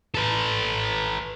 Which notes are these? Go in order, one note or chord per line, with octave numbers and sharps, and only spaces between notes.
A4 B4